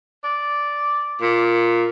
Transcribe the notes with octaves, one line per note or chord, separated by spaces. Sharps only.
D5
A#2